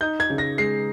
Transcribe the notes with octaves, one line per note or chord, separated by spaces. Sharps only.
D#4 G6
G#6
C#3
A#6
G#3 C7